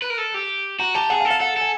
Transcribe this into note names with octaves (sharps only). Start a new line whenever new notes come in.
B4
A#4
A4
G4
F#4 A#5
G4 A5
G#4 F#5
F5
A4
F5
A4 F#5
A4 G#5